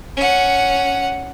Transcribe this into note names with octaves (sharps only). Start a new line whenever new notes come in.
C#4 F#5